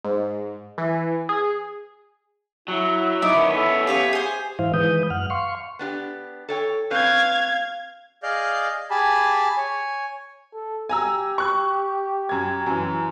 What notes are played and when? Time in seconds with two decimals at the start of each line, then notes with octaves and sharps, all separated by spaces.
0.05 G#2
0.78 E3
1.29 G#4
2.68 F#3 E4
3.22 D#4 E4 D5
3.36 D#3 B3 C#4
3.56 A4
3.87 F4 G4 C#5 E5
4.13 G#4 C5
4.59 G#2 E3 E4 C5 F5
4.74 D#3 E3 G#3 B4 D#6 G6
5.10 F#2 F#5 F6
5.30 F5 C6 C#6
5.79 B3 D4 G4
6.49 A4 C#5 G5
6.91 C4 C#4 B4 F5 G#6
8.23 G#4 D5 D#5 F5 F6 G6
8.91 G4 G#4 G#5 A5 B5
9.57 C#5 G#5
10.54 A4
10.89 G4 G#5 A#5 E6
11.38 C#6 F#6
12.29 F#2 G#6
12.66 F#2 E3